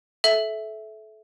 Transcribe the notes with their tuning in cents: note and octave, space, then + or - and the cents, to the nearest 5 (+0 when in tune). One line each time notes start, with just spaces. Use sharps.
A4 -25 E5 -5